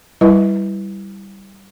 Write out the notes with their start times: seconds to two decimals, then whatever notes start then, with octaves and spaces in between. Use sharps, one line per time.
0.21 G3 E4 B4 D#5